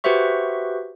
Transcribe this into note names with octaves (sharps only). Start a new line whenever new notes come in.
F#4 G4 B4 C5 E5 C#6